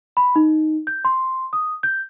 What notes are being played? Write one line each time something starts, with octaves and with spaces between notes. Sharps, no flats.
B5
D#4
G6
C6
D#6
G6